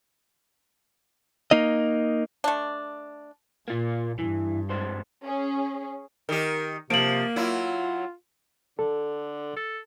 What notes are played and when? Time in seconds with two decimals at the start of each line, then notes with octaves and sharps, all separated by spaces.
1.51 A#3 D#4 D#5
2.44 A3 D4
3.68 A#2 A#3 F4
4.19 G2 E3
4.70 C2 G#2 C5
5.24 C#4 G#4
6.29 D#3 G4 A#4
6.90 C3 F3 A#3 D7 F#7
7.36 F#3 E4 F4
8.79 D3 A4
9.57 A4